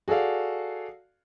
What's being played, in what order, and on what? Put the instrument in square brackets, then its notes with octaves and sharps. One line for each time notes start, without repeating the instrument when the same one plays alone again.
[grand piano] F#4 G#4 A4 D5 F5